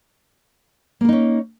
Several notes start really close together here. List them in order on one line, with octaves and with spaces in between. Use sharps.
A#3 A#4 D#4 C#4